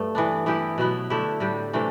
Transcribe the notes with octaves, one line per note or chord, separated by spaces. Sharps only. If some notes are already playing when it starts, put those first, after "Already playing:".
Already playing: G2 A3
E3 B3 D4
E3 B3 E4 G4
B2 F#3 B3 E4
D3 A3 E4 G4
A2 G3 D4 G4
C3 E3 A3 D4